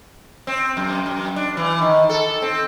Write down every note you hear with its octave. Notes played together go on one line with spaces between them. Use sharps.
C4
F#2
F#2
D4
E3
D#3
A4
C4